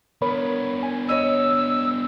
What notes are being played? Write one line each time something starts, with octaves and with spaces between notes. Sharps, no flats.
B3 D4 A#4 C#5 B5
G#5
C#5 D#5 E6 D#7